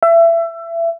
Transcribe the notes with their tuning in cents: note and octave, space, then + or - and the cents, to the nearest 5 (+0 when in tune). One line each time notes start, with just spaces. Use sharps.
E5 +25